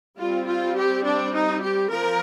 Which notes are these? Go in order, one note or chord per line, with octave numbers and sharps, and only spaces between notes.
G3 C4 F4
F4
G4
D4
D#4
G4
F3 A#4